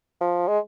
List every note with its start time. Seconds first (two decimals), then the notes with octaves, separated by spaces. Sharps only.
0.21 F3
0.48 G#3